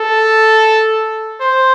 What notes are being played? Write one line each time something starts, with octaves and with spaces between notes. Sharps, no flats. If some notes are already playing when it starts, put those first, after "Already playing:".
Already playing: A4
C5